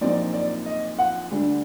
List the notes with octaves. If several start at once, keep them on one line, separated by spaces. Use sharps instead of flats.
A#1 A#2 F#3 C4 D#4 D5
D5
D#5
F#5
D2 D3 G3 D4